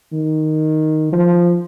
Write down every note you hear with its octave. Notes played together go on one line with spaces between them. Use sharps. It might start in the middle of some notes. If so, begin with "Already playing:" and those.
D#3
F3